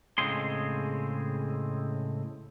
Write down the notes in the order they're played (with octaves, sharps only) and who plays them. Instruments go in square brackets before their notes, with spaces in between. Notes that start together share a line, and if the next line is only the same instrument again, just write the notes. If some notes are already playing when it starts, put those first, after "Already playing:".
[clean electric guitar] A2 C#3 G#3 C4 G#4 C6